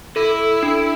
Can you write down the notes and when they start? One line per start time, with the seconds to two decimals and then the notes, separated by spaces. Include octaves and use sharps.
0.16 E4 A4
0.63 D4